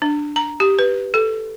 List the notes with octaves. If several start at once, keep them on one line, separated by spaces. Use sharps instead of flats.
D4
A#5
G4
B4
A4